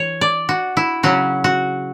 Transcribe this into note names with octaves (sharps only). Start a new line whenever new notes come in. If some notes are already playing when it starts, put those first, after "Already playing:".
Already playing: E3 C#5
D5
F#4
E4
C#3 F#3 C#4 F#4
F#4